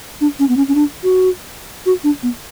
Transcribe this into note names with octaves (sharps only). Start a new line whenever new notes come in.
D4
C#4
B3
C#4
C#4
D4
F#4
F#4
D4
B3